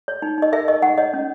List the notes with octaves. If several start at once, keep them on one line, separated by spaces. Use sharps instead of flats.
C#5
D#4
D#4 D#5
A#4 E5
A#4 D#5
D#4 F#5
C#5 D#5
C#4